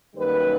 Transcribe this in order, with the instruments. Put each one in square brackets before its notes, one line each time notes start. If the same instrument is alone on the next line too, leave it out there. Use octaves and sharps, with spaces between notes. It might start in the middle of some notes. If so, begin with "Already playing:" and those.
[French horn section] F#2 D#3 G3 A#3 B4